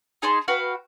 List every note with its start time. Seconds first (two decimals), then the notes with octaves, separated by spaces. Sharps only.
0.22 D#4 G#4 A5 C6
0.48 F#4 B4 F5 G5